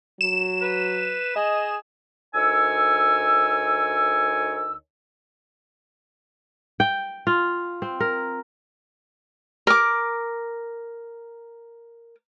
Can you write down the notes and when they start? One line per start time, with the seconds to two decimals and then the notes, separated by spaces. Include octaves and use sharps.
0.21 F#3 E7
0.62 B4
1.36 G#4 D#5
2.34 D2 D#4 A#4 C#5 G#5 E6
6.80 G5
7.27 F4
7.82 C4
8.00 A#4
9.67 A#4 D6